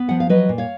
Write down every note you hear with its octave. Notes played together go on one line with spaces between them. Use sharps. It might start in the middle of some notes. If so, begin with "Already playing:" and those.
Already playing: B3
F3 F#5
F5
F#3 B4 D#5
A#2
C#5 F5